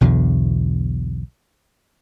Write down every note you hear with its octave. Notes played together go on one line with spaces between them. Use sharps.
B1 E2 B2 D3